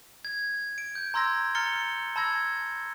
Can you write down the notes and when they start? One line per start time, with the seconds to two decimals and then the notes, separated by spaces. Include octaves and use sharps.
0.25 G#6
0.78 D7
0.95 G6
1.14 A#5 C6 E6 G#6 A#6
1.55 A#5 F6 A6 C#7 G7
2.16 A5 B5 E6 G#6 A#6